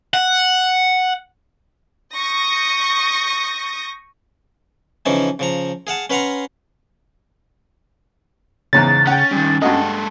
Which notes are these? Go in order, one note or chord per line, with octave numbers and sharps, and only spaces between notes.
F#5
C#6 D#6 G6 A#6
C#3 E3 F3 C#4 D#4
C#3 F3 A#5
G#4 F5 F#5 A5
C#4 B4 F5 F#5 A#5 C6
E2 G#2 C#3 C#4 A6
C#4 F#5 G5
G2 D#3 C#4
G2 G#3 F#4 A4 D#5